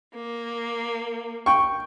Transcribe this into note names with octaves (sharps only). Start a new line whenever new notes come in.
A#3
G5 C#6